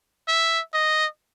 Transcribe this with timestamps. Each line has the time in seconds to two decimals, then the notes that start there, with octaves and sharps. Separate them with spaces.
0.28 E5
0.74 D#5